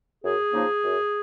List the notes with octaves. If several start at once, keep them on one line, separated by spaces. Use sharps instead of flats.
F#2 G#4
C#3 F3 A#3 D#4
F#2